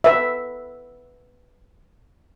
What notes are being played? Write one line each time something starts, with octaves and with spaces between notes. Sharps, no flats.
B4 E5